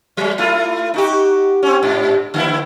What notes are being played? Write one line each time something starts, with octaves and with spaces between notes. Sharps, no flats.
F#3 G#3
A3 E4 F4
D#4 F#4 G4
C4 C#4
G#2 C3 D4
D3 A#3 E4